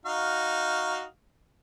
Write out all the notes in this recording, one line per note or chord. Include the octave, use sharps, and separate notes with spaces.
D#4 F#4 F5